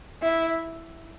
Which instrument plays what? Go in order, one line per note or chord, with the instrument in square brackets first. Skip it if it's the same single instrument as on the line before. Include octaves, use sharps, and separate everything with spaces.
[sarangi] E4